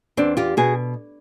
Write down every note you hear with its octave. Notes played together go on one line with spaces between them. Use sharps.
E2 C4 D4
F4 G4
B2 F#4 G#4